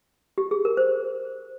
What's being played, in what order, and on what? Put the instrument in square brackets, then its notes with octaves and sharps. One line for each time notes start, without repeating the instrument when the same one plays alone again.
[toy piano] G4
G#4
A#4
C5